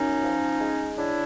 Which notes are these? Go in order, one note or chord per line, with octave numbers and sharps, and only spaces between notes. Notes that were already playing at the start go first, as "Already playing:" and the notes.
Already playing: F#2 C#4 D#4
F3
G#3
C#3 D4 E4